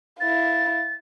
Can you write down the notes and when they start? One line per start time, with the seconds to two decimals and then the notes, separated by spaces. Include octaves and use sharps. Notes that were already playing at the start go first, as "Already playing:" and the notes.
0.20 E4 F5 A6